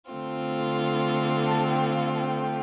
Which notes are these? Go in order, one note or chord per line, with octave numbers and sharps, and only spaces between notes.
D3 A3 C4 F4
A5
G5
F5
A5
G5